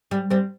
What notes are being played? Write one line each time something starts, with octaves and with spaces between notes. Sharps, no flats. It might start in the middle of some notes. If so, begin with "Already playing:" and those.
G3
G3 C4